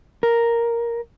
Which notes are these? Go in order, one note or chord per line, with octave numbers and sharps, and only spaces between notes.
A#4